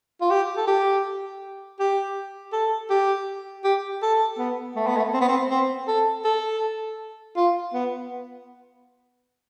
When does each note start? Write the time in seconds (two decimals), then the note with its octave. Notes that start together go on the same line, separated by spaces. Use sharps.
0.21 F4
0.30 G4
0.57 A4
0.67 G4
1.80 G4
2.53 A4
2.90 G4
3.64 G4
4.02 A4
4.39 B3
4.76 A3
4.87 B3
4.97 A3
5.14 C4
5.21 B3
5.29 C4
5.50 C4
5.88 A4
6.25 A4
7.37 F4
7.74 B3